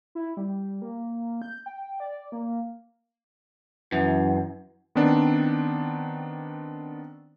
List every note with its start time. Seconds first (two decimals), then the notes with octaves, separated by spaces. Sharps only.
0.15 E4
0.37 G3
0.82 A#3
1.42 G6
1.66 G5
2.00 D5
2.32 A#3
3.92 F#2 E3
4.95 D#3 B3 C4 D4